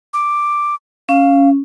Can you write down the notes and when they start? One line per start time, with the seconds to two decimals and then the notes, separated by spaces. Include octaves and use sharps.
0.14 D6
1.09 C#4 F5